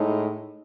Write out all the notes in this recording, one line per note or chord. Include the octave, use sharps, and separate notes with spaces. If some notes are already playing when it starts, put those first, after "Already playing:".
Already playing: A2 G#3 D#4